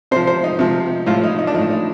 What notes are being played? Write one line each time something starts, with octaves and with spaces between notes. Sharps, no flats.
C3 F3 C5
C5
D#4
C3 F3
A2 F3 F4
D#4
D#4
D4
A2 F3 D#4
D#4